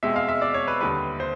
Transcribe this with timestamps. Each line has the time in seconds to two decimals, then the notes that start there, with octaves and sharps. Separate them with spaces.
0.03 B2 G#3 C4 E5
0.16 F5
0.28 E5
0.42 D5
0.54 C#5
0.68 B4
0.81 D#2 D3 G3 B4
1.20 C5